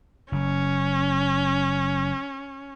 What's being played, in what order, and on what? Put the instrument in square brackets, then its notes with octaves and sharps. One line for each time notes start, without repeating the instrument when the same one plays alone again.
[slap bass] F#1 [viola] C#4